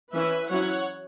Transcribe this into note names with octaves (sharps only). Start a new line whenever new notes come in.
E3 C#4 E4 B4 E5
F#3 C#4 E4 C#5 F#5